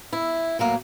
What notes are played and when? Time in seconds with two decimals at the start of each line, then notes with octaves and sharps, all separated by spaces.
0.13 E4
0.59 A2 F#3 A#3